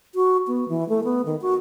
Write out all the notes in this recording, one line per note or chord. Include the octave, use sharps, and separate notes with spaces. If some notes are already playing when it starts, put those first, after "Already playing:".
F#4
B3
E3
A3
B3
D#3
F#4